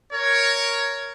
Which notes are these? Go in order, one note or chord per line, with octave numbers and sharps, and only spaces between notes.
A#4 C#5